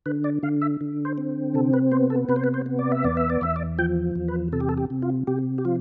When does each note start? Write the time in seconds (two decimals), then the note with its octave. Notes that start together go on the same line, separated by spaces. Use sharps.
0.06 D3 B4
0.24 D5
0.43 D3 F5
0.62 E5
0.81 D3
1.05 C5
1.18 C4
1.54 C3 A4
1.73 B4
1.91 B3 C5
2.10 A4
2.29 C3 B4
2.36 C5
2.44 B4
2.54 C5
2.66 B3
2.79 D5
2.92 E5
3.04 E2 D5
3.17 E5
3.30 D5
3.41 E2 E5
3.56 D5
3.79 F3 G5
4.15 E2
4.28 B4
4.53 C3 A4
4.60 G4
4.69 A4
4.78 G4
4.90 C3
5.02 F4
5.27 C3 G4
5.58 G4
5.65 F3 F4